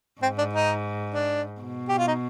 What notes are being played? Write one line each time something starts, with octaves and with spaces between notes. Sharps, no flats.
G#2 C4
D4
D#4
D4
B2
G4
F4
D#4